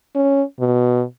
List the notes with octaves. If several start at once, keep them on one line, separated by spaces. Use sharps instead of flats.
C#4
B2